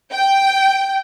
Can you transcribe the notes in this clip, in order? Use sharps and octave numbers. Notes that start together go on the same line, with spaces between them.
G5